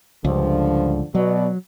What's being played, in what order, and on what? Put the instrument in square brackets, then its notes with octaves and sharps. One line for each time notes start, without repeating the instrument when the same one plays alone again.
[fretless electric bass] C#2 [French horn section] G2 D3 F3
[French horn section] B2 D5 [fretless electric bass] F#3